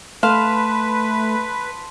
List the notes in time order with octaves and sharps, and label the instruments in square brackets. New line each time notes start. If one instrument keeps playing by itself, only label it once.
[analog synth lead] A3 [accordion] B4 [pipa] F5 [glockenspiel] A5 C6 E7